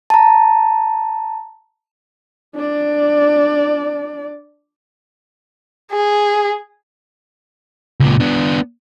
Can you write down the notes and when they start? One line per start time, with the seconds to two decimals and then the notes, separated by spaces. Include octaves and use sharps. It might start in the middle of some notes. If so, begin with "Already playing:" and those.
0.10 A5 A#5
2.56 D4 D5
5.92 G#4
8.00 C#2 A#2
8.20 B3 D4